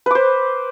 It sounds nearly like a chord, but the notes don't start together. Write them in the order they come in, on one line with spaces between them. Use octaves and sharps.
B4 D6 C5